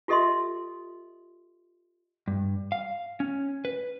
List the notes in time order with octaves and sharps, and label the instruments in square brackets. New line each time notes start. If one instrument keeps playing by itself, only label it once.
[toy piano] F4 G4 A4 D#5 E5 C6
[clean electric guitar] G2
F5
C#4
B4